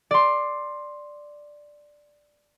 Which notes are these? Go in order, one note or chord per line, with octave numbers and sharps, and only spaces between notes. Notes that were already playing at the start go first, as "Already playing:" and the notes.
D5 C6